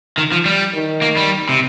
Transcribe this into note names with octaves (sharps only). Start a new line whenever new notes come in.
D#3
F3
G3
D#3
A#3
G3
C3